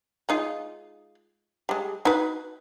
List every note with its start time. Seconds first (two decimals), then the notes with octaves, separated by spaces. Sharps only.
0.29 G#3 D#4 F4
1.69 G3 G#3
2.05 D#4 F#4 B4